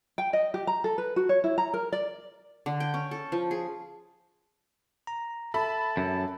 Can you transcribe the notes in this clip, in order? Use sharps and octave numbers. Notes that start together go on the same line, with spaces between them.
G5
D#5
G4
A#5
A4
B4
F#4
C#5
E4
A#5
A#4
D5
D3
G5
C#4
A4
F3
G#4
A#5
A4 E5 A5 B5
F#2